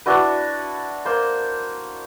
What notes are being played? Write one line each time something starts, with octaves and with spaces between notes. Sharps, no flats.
D4 E4 F#4 B4
A#3 C5